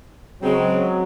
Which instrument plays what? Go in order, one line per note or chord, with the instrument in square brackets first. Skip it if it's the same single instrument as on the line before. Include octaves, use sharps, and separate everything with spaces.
[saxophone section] C#3 G#3 C4 [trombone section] F#3